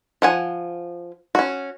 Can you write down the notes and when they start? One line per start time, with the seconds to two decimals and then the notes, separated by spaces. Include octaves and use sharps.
0.22 F3 F#5 G#5
1.35 C#4 F#4